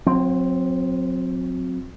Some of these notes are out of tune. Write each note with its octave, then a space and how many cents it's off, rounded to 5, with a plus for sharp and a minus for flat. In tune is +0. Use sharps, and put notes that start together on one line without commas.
F#3 -40 C4 +0